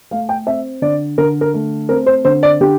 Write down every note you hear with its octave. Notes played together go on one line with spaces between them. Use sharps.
A3 F5
G5
C4 E5
D3 D5
D3 A#4
A#4
A3
C4 A#4
C5
D3 C5
D5
D3 G4